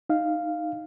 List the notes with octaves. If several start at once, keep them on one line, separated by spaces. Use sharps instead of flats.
D#4 F5